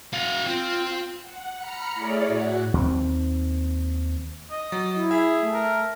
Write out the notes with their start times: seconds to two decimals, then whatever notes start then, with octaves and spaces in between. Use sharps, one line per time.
0.13 F#4 F5
0.46 C4 F4
1.23 F#5
1.55 A#5 B5 F6 C#7
1.94 A3 E4 G#4 C#5 D5
2.24 A2 F#4
2.74 D#2 C4
4.51 D#5
4.72 F#3
4.96 E4
5.11 G#4 E5
5.41 A3
5.54 A#4